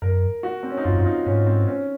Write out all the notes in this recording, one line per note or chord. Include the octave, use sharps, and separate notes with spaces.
F#2 A#4
F#4
C4
C#4
D#4
F#2 F4
F2
F#2 F4
D#4
G#2 C#4
C4
C#4